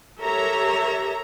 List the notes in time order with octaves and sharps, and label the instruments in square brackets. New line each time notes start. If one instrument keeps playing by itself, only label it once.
[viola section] G4 A4 A#4 C#5 E5 A#5